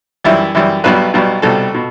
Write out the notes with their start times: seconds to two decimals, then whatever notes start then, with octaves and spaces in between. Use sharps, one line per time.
0.24 F#2 E3 G3 E4
0.55 F#2 E3 G3
0.84 B1 B2 G3 B4
1.14 B1 B2 G3
1.42 C2 B2 G3 A4
1.74 B2